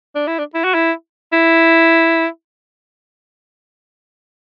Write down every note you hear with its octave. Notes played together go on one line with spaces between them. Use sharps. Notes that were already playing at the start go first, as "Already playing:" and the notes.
D4
E4
D4
E4
F#4
E4
E4